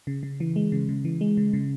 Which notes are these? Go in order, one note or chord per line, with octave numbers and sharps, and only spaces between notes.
C#3
C#3
E3
G#3
C#3
C#3
E3
G#3
C#3
C#3